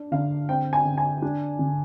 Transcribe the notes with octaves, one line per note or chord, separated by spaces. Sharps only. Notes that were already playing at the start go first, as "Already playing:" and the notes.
Already playing: D4
D3 F5
C4 G5
G#5
D3
G#5
D4
D3